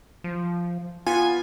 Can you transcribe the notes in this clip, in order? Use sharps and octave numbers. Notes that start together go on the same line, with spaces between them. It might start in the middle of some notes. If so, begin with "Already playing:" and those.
F3
B3 F4 G#5